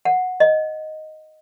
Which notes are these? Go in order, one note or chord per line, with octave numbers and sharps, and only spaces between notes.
F#5
D#5